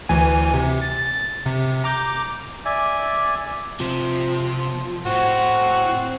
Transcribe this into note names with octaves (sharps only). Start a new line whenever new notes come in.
D2 E3 G#5
C3
A6
C3
A#5 D6 G6
D5 E5 G#5
C3 F3
A2 C4 F#4